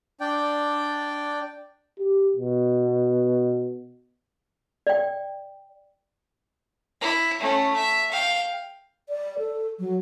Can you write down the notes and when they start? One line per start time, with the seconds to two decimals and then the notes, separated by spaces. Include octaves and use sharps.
0.20 D4 D5 G5
1.99 G4
2.37 B2
4.87 D5 G5
7.01 E4
7.39 A3 C#4
7.76 E5
8.11 F5 G5
9.09 D5
9.39 A4
9.79 F#3